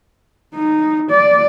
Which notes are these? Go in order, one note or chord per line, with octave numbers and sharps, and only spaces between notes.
D#4
D5